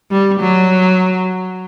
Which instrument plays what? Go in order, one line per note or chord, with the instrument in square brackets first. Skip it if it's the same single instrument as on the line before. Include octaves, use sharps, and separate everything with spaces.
[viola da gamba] G3
F#3